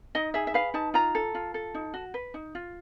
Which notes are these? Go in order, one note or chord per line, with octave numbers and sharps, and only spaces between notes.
D#4 D#5
G#4 E5
E5
B4 F5
D#4 A5
F4 A#5
A4
F4
A4
D#4
F#4
B4
D#4
F4